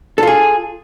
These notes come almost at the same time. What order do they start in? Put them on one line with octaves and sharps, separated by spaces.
A4 F4 G#4